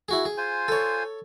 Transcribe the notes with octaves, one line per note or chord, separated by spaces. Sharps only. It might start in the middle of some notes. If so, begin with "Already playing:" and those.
E4 F#4 G#4
G#4
F4 C5 G#5
A4 C#5